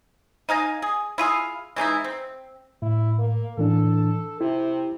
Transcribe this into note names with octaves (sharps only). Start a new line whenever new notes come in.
D#4 F5 G#5 A#5
G#4
E4 F4 G#4 F5
E3 G#3 D#4 E4
C4
A2 E4
A#3
A2 E3 D4 A4
C3 E4